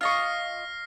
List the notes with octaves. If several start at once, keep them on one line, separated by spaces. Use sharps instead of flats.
F4 D#5 C#6 F6 A#6 C7